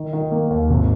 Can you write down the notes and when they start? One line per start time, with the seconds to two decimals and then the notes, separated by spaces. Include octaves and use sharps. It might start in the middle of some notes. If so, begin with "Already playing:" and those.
Already playing: D#3
0.13 D#3
0.31 A#3
0.50 D#2
0.70 G#1